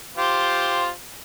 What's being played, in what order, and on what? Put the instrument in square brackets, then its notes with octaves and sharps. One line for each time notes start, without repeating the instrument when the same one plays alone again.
[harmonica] F4 G4 C5